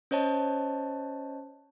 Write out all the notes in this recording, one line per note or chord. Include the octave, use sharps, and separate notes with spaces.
C#4 C5 C#5 D#5 A5